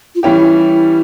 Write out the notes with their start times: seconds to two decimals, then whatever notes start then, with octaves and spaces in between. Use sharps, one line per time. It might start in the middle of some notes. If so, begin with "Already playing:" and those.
0.15 F4
0.23 E3 G3 C#4 E4 G4